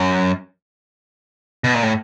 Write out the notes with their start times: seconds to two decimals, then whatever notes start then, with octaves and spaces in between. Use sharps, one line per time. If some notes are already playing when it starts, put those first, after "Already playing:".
Already playing: F#2
1.64 B2
1.74 A#2
1.83 A2